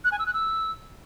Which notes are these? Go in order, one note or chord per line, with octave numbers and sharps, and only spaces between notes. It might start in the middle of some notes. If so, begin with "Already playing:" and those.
F#6
G#5
E6
F#6
E6